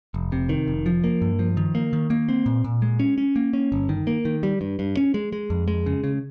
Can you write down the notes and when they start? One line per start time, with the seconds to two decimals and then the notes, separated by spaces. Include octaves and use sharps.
0.14 F1
0.32 C3
0.49 D#3
0.68 F1
0.86 F3
1.04 A#3
1.21 G2
1.39 F3
1.57 D#3
1.75 A#3
1.93 D#3
2.10 A#3
2.29 C4
2.46 A#2
2.64 A#2
2.82 G#3
3.00 C#4
3.18 C#4
3.36 A#3
3.53 C#4
3.72 G1
3.89 D#3
4.07 A#3
4.25 D#3
4.43 G3
4.61 G2
4.79 G2
4.97 C#4
5.14 G#3
5.33 G#3
5.50 F2
5.68 G#3
5.86 C#3
6.04 C#3